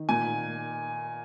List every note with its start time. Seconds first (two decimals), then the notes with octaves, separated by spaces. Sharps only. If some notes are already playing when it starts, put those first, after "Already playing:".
Already playing: D#3
0.09 A#2 G#5